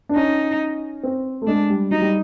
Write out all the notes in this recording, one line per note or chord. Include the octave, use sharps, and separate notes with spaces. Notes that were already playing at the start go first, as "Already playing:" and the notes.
D4
C#4 D#4
C4
A3
G#3 D4
G3
F#3 D#4
G3